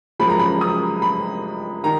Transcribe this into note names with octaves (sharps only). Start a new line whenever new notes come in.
F#1 F#2 F3 G#3 B5
A#5
B5
D#6
B5
D#3 A#5